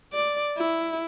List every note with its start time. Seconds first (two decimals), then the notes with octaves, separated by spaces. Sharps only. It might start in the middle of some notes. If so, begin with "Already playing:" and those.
0.13 D5
0.57 E4